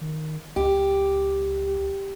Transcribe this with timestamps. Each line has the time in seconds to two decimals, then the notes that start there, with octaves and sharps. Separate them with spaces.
0.01 D#3
0.56 C#2 G4